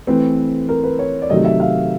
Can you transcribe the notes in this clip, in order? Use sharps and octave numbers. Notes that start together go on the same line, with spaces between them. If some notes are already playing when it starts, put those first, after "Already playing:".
E3 A3 C4 B4
A#4
B4
C#5
D5
C3 D#3 F#3 A3 D#5
E5
F5